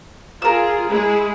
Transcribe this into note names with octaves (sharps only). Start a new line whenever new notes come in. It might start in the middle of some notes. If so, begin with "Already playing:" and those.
F4 G#4 A#4 E6
G#3 E4 G#4